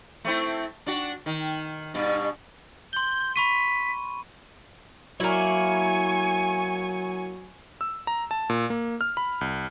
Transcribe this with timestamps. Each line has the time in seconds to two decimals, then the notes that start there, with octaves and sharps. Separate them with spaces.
0.25 A3 C4 E4
0.86 D4 F#4
1.26 D#3
1.94 G2 B2
2.93 C6 G6 G7
3.36 B5 C#6 B6 D#7
5.20 F#3 A#3 E4 G#5 C#6
7.81 E6
8.07 A#5
8.31 A5
8.50 A#2
8.70 A#3
9.01 F6
9.17 B5
9.41 C2